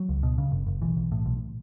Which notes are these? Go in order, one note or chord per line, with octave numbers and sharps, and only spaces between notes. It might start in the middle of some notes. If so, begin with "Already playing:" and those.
Already playing: F#3
C#2
B2
C#3
F#1
F#1
B1 E3
B1
A2
B1